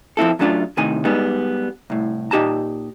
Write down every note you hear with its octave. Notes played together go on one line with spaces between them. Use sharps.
F3 C4 E4 A4
F#2 F#3 A3 D4 D#4 F4
C2 A2 C3 D#3 G#5
G3 G#3 B3 D#4
C2 A2
A#2 D#4 G4 A5 A#5